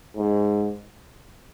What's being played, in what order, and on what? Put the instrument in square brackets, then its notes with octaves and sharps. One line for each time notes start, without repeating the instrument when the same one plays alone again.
[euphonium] G#2